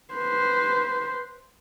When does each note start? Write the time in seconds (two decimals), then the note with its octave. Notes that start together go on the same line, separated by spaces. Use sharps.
0.14 B4 C5